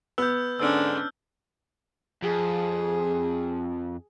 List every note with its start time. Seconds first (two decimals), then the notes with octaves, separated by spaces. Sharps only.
0.18 B3 E6 G6
0.60 G#2 D3 C#4 D4 E6 F6
2.23 F2 G#4